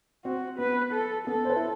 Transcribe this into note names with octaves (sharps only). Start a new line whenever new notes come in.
C4 F#4
B3 B4
A4
B3 A4
C5
B4
E4